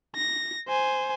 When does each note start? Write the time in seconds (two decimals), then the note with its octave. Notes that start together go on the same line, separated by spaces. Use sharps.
0.16 A#6
0.68 C5 G#5